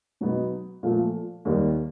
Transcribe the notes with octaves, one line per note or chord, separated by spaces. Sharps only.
B2 F#3 B3 D#4
A#2 F3 A3
D#2 D#3 G3